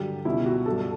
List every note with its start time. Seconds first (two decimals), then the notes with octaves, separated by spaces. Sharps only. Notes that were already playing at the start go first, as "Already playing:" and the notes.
Already playing: G2 D3 F#3 G4
0.25 C#2 B2 G3 E4
0.46 F#4
0.66 G2 F#3 A4
0.81 A4